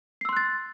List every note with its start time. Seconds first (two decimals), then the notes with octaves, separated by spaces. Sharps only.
0.21 C7
0.25 E6
0.29 C6
0.33 F#6
0.37 A6